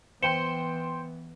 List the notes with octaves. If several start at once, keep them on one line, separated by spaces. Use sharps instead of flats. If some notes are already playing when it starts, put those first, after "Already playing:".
E3 B3 C5 G5 C6 C#7 E7 G7